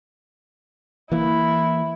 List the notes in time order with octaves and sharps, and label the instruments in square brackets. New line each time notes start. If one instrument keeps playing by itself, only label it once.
[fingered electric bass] E3 A#3 [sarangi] E4